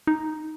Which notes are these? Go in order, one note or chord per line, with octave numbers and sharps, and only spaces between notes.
D#4